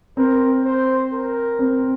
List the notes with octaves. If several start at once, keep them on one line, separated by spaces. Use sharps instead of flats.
C4 A#4
C5
A#4
C4